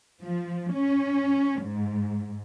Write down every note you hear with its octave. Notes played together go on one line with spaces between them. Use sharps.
F3
C#4
G#2